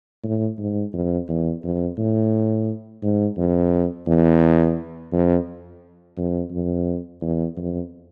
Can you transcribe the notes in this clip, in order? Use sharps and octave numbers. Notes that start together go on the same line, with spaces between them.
A2
G#2
F2
E2
F2
A2
G#2
F2
E2
F2
F2
F2
E2
F2